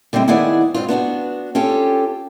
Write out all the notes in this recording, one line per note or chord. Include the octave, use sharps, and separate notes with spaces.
D3 G3 G#3 C4 E4
D#3 B3 E4 G#4 D5 F#5
G#2 C4 D4 F4
B3 D4 E4 F#4
C#4 F4 G4 A4